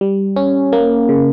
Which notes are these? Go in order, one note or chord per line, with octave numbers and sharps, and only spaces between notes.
G3
C#4
A#3
C#3